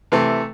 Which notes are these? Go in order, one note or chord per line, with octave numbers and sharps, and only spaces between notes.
C3 E3 A3